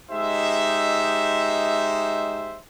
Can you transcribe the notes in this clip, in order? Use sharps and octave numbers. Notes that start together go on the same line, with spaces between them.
G#3 D#4 G4 C5 E5